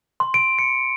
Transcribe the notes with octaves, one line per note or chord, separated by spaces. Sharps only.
C6
D7
C#7